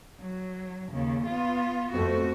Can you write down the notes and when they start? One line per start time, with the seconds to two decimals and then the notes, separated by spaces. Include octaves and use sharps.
0.20 F#3
0.92 D#2 C#3
1.26 B3 F4
1.92 F2 A3 C4 F#4